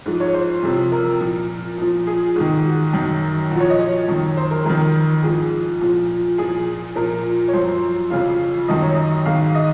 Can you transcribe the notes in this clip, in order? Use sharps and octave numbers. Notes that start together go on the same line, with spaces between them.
G#2 F3
C#5
C5
F2 C3 F3
A#4
A#2 F3
A#2 F3
G#4
G#2 D#3
F#4
F#2 D#3
A#2 F3 F#4
C#5
D#5
C#5
F#2 D#3
C5
A#4
F2 D#3 A#4
G#2 F3 G#4
A#2 F3
A#2 F3 G#4
A#2 F3 A#4
C#5
F#2 F3 C5
F2 C#3 F3 F5
F#2 D#3 D#5
C#5
D#5
G#2 D#3 F5
F5
D#5